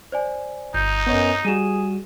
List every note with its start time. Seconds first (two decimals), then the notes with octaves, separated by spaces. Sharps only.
0.12 C5 D5 G#5
0.74 G1 D#4 G6
1.07 F#2 B3 C#5 D#5
1.45 G3 F#4 G#4 D#7 E7